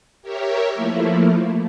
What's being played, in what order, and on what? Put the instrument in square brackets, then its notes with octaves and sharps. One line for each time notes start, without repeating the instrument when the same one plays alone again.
[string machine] G4 A#4 C#5 E5
F3 A3 A#3 E4